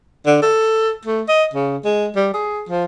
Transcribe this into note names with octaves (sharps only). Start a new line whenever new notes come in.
D3
A4
A3
D#5
C#3
G#3
G3
G#4
F3